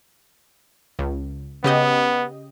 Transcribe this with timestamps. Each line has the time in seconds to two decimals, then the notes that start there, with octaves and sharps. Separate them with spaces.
0.99 C#2
1.64 C#3 B3 G4 D#5